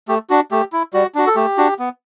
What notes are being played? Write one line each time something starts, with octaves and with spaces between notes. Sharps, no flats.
A3 G4
D4 F#4
A3 G4
E4
G3 F#4
D4 F#4
A4
A3 G4
D4 F#4
B3